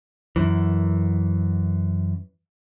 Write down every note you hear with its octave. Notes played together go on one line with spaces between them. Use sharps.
F#2 E3